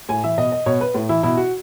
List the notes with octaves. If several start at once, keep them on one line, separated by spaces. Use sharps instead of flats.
A2 G#5
E3 E5
B2 D#5
D#5
B2 C#5
B4
A2
E3 E4
B2 E4
F#4